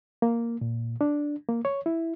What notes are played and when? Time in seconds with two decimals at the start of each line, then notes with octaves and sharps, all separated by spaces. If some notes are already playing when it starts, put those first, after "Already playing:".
0.22 A#3
0.61 A#2
1.01 D4
1.49 A#3
1.65 C#5
1.86 E4